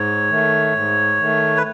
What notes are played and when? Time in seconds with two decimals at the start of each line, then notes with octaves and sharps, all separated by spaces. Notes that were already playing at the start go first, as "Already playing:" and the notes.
Already playing: G#2 C#5
0.29 D#3 A3
0.74 G#2
1.18 D#3 A3
1.57 B4